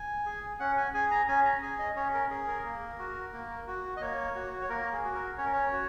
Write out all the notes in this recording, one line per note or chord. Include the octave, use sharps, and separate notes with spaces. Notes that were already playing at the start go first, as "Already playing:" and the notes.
Already playing: G#5
G#4
C#4 F#5
G#5
G#4 G#5
A#5
C#4 G#5
A#5
G#4 G#5
D#5
C#4 C#5
A#4
G#4
A#4
A#3
F#4
A#3
F#4
D#5
A#3 C#5
F#4
C#5
A#3 A#4
G#4
F#4
A#4
C#4 C#5
A#4
C#5
F#4